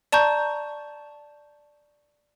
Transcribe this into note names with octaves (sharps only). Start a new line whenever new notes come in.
D5 A5 A#5 C#6 G6